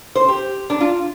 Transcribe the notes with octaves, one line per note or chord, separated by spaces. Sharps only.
C5
G4
D4
F4